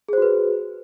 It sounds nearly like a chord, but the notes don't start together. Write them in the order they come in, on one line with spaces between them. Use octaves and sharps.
G#4 C5 F#4 B4